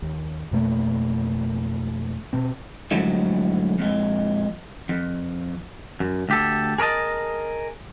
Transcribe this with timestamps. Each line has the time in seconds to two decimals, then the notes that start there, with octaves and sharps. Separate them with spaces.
0.02 D#2
0.51 F2 B2 A3 A#3
2.33 B2 C4
2.91 F#2 A2 D3 F3 F#3 G#3
3.79 F2 A#2 G#3
4.89 F2
6.00 F#2
6.29 D2 G4 A4
6.78 G#4 A#4 C#5 D#5 A5